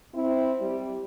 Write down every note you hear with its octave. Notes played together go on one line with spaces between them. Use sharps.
C4 E4
G3